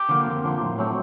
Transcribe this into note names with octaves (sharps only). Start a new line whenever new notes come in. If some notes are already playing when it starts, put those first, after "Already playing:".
Already playing: G4
D3 F3 A#3
F2
D3 F3 A#3
A2
F#3 A3 C4